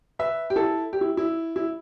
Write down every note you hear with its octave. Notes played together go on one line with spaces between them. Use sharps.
B4 E5
G4
E4 A4
G4
E4
E4
E4